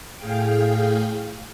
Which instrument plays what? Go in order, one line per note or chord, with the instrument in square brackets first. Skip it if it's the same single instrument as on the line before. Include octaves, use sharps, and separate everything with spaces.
[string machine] A2 G#4 F5 G5